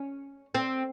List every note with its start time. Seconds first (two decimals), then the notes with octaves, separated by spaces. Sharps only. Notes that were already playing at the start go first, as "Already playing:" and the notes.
Already playing: C#4
0.55 C4